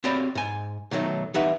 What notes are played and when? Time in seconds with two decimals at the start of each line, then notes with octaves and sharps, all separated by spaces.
0.04 C4 F#4 G4 C#5 D5 B5
0.35 G#2 G#5
0.91 B1 D#3 F#3 A3 D#4
1.34 C2 E3 D#4 B4 E5 F#5